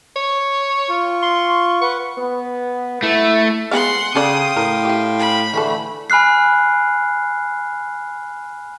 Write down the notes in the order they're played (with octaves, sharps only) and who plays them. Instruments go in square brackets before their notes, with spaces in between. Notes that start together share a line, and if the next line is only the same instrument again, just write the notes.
[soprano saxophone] C#5
[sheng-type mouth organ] F4 C#6
[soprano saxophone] C6
[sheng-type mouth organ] B4 F#5 [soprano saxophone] C#6
[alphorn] B3
[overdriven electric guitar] A3 [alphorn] E4
[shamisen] G#3 B3 F5 [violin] F#5 C6
[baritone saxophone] C#3 [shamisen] A4 D5 [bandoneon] F5 G5 C6 [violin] D#6
[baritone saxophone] A2 [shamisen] A#4
[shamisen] E4 G4
[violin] B5
[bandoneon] D3 E3 A3 [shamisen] E4 A4
[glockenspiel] G#5 B5 F6 F#6 C7